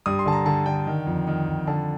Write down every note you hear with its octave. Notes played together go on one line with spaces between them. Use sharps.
G2 D#6
C6
D3 A5
A#5
D3 A5
D3 G5
D#3
F2
D#3
F2
D3 A5